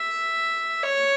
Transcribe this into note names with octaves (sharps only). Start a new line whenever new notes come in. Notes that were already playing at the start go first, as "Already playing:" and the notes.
Already playing: E5
C#5